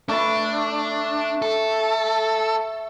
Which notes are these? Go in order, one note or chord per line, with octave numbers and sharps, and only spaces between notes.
A3 D4 B5
A4